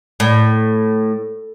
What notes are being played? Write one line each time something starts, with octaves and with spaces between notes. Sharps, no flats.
A2